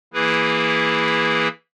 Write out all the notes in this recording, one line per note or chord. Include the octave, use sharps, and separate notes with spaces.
E3 A#3 E4 G#4 B4